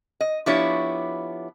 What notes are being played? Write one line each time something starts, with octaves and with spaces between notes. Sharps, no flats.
D#5
F3 B3 D4 E4 G4 C#5